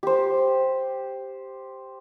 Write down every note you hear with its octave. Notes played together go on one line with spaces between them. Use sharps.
G4 C5